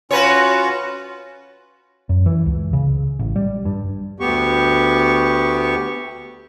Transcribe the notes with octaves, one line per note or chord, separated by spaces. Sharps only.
C#4 F4 F#4 B4 C#5
F#2
E3
C#2
C#3
A1
G3
G2
D2 B3 G4 C#6